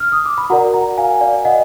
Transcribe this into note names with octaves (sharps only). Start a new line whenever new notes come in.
F6
D#6
D6
B5
F#4 A#4 D5 F#5 A#5
F#5 A#5
F5 G#5
D5 F5
D#5 F#5